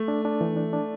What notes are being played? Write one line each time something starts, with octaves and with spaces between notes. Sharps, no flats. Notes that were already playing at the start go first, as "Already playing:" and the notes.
Already playing: A3
D4
D4
E3
D4
D4